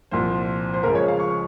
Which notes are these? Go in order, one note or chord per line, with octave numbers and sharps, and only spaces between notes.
C2 A#2 F3 C5
C5
C#2 C#3 F3 A#4
C#5
F5
C#6